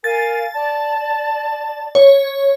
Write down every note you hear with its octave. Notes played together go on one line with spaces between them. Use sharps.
A#4 F5 G#5 A6
D5 A5
C#5